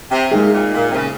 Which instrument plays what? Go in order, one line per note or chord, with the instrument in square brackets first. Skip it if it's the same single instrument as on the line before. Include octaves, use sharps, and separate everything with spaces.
[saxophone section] C3
[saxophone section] A#2 [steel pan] G#3 D#4 G#4
[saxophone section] A#2
A#2
C3
C#3